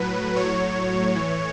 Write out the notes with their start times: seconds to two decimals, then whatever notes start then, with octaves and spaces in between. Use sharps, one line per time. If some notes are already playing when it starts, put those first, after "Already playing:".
Already playing: A2 F#3 B4
0.36 A2 F#3 C#5
1.14 A2 E3